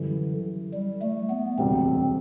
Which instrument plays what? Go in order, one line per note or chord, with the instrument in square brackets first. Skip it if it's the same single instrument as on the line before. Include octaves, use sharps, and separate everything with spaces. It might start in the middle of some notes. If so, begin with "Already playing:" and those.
Already playing: [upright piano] F#2 E3 G3 [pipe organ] D3
[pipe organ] G3
A3
B3
[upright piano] E1 D2 C3 G3 [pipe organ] C4